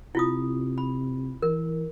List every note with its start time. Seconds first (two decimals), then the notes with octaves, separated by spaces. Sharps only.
0.15 C3 E4 F4 D#6
0.78 B5
1.42 E3 A#4